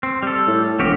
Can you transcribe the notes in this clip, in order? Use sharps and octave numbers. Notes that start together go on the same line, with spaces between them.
C4
G3 A4
A2
E1 F3 F#4 G4